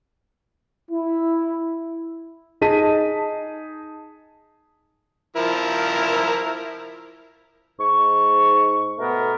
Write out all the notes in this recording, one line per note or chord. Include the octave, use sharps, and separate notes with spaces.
E4
D#4 G#4 D#5 A5 B6 D#7
F3 E4 A#4
G#2 C#6
B2 A3 B3 A#4